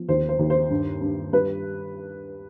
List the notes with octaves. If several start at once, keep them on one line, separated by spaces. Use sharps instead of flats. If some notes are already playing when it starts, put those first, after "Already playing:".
Already playing: F3 B3
D#2 C5
C5
D#2
C5
G2
G2
G3 B4